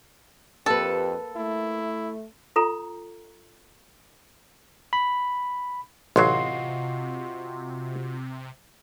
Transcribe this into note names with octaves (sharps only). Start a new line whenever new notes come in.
F2 A#3 G4 A4 B4
A3 E4
F4 A4 A#5
B5
A1 C3 F#3 F4 F#4 D#5 C6 C7